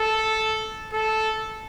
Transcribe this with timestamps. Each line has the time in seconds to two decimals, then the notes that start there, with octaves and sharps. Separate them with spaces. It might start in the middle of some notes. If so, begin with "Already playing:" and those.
Already playing: A4
0.93 A4